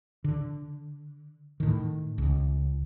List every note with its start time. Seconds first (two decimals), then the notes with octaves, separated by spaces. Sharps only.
0.24 D3
1.60 A2 D#3
2.18 C#2